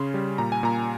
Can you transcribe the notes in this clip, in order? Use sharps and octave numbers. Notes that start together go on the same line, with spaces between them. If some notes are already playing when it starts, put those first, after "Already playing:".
Already playing: C#3 C#4 C6
G3
A#2 A#5
G#5
A#2 A#5